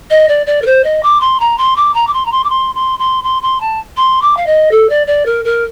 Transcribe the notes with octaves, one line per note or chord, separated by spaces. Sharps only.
D#5
D5
D5
A#4
C5
D#5
D6
C6
A#5
C6
D6
A#5
D6
C6
A#5
C6
D6
C6
C6
C6
C6
C6
A5
C6
D6
F5
D#5
A4
D5
D5
A#4
A#4